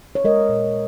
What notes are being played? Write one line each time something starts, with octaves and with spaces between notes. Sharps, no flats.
C#5
G#3 A#4 D#5
A#2